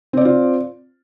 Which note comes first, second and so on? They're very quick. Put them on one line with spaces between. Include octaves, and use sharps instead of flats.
C4 D5 C5 F4